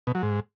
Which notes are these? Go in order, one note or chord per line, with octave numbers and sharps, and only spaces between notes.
B2
F#3
G#2